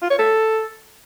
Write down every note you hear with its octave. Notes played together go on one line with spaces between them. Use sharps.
F4
C#5
A4